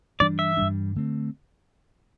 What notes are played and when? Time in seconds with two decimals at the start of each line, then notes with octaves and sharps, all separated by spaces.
0.20 G2 E3 G3 D4 D5
0.39 E5
0.57 G2 E3 G3 D4
0.95 D3 A3 C4